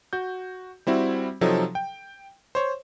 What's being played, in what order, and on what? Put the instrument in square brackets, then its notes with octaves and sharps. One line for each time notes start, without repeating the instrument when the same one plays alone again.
[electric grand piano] F#4 G6
G3 C4 E4 F#4
C3 F3 F#3 D#4 A4
G5
C5 C#5